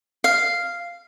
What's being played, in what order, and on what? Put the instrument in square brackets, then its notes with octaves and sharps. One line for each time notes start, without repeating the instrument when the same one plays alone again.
[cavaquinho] F5